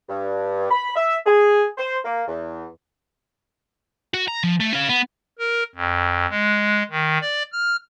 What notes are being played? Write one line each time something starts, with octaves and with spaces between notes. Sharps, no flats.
G2
B5
E5
G#4
C5
A#3
E2
F#4
A#5
F3
A3
C#4 F5
B3
A#4
F2
G#3
D#3
D5
F6